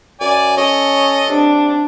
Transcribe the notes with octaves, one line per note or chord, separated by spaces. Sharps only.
F#2 D5 G#5
C#4 A4 C#5 D#5
C3 D4